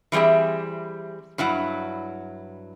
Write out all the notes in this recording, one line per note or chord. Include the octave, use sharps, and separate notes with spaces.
E3 G3 C4 G#4 E5
G2 F#3 E4 F#5